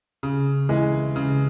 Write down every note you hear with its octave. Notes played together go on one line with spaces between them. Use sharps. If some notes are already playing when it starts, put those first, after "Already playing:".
C#3
E3 G#3
C#3